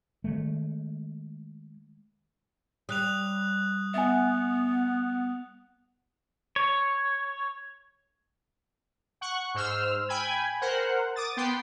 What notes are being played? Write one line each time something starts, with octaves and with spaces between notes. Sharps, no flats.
D#3 G#3 A3
G3 D#6 F#6 F7
B3 E5 G#5
C#5
F#5 C#6 F#6
G#2 C5 E6 F6
G5 G#5 B5 G#6
A#4 C5 F#5
D6 D#6 A6
B3 G5 C6